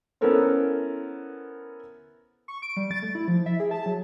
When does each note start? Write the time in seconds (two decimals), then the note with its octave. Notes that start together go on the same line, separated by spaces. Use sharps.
0.21 B3 C#4 E4 A4 A#4 C5
2.48 C#6
2.62 D7
2.77 G3
2.91 A6
3.03 A3
3.15 E4
3.28 F3
3.46 E5
3.60 G#4
3.71 A5
3.86 F#3